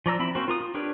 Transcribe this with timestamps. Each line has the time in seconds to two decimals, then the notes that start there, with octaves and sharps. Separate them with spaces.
0.06 F3 D5 A#5 E6
0.19 C4 E4 B5
0.35 A#3 C4 C#4 F#4 C5
0.48 F4 A#4 D#6
0.61 F4
0.74 D4 G4 A#4 B4 C#5